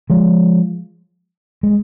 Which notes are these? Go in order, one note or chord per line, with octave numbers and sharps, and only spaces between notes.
F3 G#3
G#3